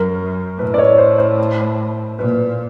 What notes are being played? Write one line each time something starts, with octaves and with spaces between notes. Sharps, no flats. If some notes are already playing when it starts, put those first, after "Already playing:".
Already playing: F#2 A#4
A2 B4
D5
C#5
C5
C5
A#2 B4